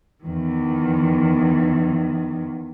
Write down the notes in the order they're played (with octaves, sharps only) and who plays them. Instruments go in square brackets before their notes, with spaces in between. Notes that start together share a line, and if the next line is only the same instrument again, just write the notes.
[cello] E2 D#3